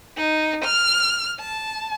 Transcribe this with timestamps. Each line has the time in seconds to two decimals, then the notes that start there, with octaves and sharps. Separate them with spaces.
0.17 D#4
0.65 F6
1.40 A5